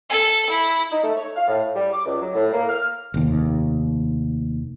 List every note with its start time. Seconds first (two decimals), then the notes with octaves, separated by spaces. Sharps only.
0.10 A4
0.50 E4
0.92 D#4
1.04 A3
1.16 C#5
1.36 F5
1.48 A2
1.75 G3
1.93 D6
2.06 C#2
2.20 F#3
2.35 A2
2.54 A#3
2.70 F6
3.14 F1 D#2